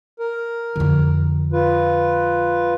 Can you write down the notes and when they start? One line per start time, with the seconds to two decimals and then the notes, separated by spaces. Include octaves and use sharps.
0.19 A#4
0.76 F2 D3
1.53 F4 B4